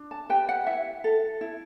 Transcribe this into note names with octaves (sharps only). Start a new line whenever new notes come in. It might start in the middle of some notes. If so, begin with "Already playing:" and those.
Already playing: D4
A5
G4 B4 G5
F#5
E4 E5
A4
E4